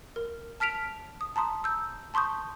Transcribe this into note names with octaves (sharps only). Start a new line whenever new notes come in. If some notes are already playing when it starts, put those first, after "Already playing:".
A#4
A5 F6 B6 D7 F7
D#6
A5 A#5 C6 D#6
E6 G6
A5 C6 C#6 D#6 G6